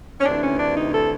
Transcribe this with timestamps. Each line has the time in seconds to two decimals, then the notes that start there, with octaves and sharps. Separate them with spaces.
0.20 C#4
0.26 D2 C3 E3 D4
0.43 C#4
0.59 D4
0.76 D#4
0.93 A4